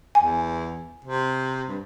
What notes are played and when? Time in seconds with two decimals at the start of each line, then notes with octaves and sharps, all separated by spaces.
0.15 E2 G#5
1.05 C3
1.69 G2